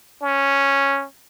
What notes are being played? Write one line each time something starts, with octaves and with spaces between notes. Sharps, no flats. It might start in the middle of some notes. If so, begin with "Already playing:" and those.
C#4